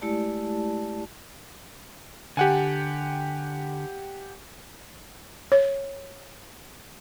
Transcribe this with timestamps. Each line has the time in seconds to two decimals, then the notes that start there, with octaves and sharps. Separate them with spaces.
0.01 G#3 A3 E4 G4 D5 A5
2.37 D3 G4 F#5 G#5
5.52 C#5